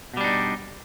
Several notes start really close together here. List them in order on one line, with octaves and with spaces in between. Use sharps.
B2 G3 D4 D#4